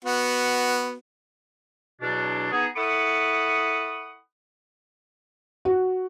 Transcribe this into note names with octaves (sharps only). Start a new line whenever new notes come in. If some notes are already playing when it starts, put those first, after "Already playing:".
B3 F#4
E2 B2 F#3 D4
B3 D#4 G#4
E4 A4 F#5 B5 C#6 D#6
F#4